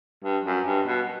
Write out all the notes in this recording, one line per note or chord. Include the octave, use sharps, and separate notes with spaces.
G2
F#2
G2
B2